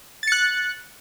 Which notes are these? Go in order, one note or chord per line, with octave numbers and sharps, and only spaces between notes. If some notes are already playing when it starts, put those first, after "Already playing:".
F#6 A6 C#7